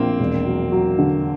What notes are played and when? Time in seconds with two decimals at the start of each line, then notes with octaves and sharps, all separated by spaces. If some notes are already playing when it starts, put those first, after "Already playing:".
Already playing: A#1 A#3 C4
0.20 E1
0.46 F#3
0.72 F#3
0.99 D3